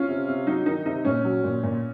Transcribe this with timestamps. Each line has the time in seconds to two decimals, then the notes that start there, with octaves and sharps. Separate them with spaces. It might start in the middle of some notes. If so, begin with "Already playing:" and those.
Already playing: C#4 F4
0.08 C3
0.28 C3
0.47 F#3 D#4
0.66 D#3 D#4
0.86 C3 D#4
1.05 A#2 C#4
1.24 F#3
1.44 A#2
1.63 A#2